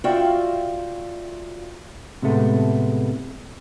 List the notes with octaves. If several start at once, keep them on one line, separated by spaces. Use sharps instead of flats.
F4 F#4 D5 E5 F5 G5
A2 C3 G#3 A3 B3